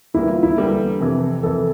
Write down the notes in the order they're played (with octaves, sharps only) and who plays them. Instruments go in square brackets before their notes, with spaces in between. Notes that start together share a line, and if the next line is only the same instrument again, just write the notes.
[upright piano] E2 D3 G3 A#3 [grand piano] E4
[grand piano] F4
E4
[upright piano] E2 D3 G3 A#3 [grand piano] A4
[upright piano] F2 C3 E3
[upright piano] F2 C3 E3 [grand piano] A4